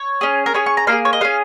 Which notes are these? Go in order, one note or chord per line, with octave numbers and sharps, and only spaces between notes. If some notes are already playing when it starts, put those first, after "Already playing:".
Already playing: C#5
C#4 G#4
A#4
C#4 G#4 C#5
C#6
A#5
A#3 D#4 G#4 F5
C#5
D#5
C#4 G#4 F5